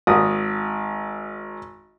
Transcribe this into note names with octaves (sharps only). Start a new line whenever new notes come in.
G#1 D#6